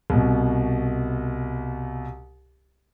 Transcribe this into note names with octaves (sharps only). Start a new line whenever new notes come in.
C2 B2